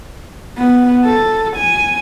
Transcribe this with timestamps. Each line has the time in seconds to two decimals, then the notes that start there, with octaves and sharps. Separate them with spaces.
0.57 B3
1.05 A4
1.57 G#5